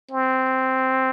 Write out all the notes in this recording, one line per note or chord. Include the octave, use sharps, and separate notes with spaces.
C4